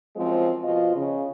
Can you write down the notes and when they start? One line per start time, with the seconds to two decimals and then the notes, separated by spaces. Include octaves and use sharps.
0.16 F#2 F3 G#3 C4
0.63 B2 F3 F4 D#5
0.95 C#3